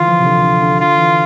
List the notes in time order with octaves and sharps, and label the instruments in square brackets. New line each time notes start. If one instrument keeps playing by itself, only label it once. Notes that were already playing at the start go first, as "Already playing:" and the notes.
Already playing: [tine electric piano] D3 E3 [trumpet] F4
[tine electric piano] F3
C3
D3
D3
D3
[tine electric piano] D3 [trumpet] F4
[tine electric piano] E3